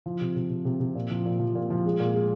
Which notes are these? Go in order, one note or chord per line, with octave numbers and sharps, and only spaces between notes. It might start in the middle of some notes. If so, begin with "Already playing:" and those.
F3
C3
C3
C3
C3
C3
A#2
F3
A#2
F3
A#2
F3
G#3
A#2
G#3